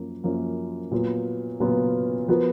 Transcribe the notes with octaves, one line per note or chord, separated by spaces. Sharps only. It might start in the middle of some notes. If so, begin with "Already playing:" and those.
Already playing: F#2 F3 A#3
F#2 F3 A#3
A#2 F#3 B3 F4
A#2 F#3 B3 F4
F3 B3 F#4 A#4